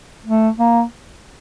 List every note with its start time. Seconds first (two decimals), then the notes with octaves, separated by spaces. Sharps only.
0.26 A3
0.59 A#3